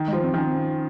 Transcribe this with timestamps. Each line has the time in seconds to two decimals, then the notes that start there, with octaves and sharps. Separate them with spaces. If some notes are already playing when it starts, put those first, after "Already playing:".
Already playing: D#3
0.08 F3 G#3
0.24 C4
0.34 D#3 C#4
0.47 C4
0.55 C#4